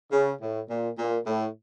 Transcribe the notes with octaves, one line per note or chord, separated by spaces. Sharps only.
C#3
A2
A#2
A#2
A2